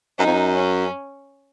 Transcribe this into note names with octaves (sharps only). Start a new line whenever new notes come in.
F#2 D#4
F2
F#2
C#4